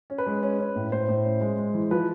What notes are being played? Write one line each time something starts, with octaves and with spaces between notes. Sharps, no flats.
C#4
B4
G#3
C#4
C#4
A2
A2 C5
A2
C#4
G#3
G#3
E3
F3 B4